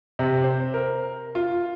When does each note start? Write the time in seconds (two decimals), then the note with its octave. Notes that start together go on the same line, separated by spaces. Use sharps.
0.19 C3
0.44 C5
0.74 A#4
1.35 F4